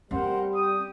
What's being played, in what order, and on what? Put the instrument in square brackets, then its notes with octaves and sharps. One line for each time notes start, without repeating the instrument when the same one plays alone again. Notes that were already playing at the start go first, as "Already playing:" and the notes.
[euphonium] G3 [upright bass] C4 [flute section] A#4 C5 F#5
[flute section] G4 [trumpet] D#6